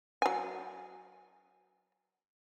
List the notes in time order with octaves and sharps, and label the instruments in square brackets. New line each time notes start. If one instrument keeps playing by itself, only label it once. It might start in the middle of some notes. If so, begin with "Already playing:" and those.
[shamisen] F#3 G#5